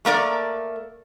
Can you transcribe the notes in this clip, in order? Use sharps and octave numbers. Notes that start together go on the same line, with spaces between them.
A3 A#3 A#4 D5